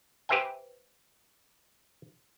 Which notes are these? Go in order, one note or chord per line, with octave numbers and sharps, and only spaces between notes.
G4 B4 C5 E5 G5 G#5